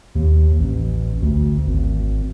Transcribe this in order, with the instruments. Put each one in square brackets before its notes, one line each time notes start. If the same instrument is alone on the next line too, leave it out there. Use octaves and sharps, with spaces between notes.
[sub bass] D#2
A1
D2
G#1